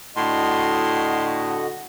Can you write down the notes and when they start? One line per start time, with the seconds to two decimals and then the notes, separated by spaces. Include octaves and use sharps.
0.16 A2 D3 F#4 D#5 C6